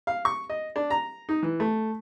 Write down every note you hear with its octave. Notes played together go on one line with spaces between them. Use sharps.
F5
C#6
D#5
D4
A#5
D#4
E3
A3